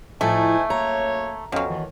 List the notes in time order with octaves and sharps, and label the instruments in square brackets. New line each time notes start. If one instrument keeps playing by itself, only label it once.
[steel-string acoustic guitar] A2 F3 [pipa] A3 [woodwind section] D#4 C5 G#5
[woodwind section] F#2 A#3 C#5 [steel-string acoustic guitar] A#5
[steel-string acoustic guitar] F2 [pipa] B2 F#3 [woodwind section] C#4 F5
[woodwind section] A2 D#3 E3